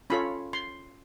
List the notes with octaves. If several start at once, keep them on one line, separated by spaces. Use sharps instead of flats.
C#4 F4 A4 C#5 B5
C6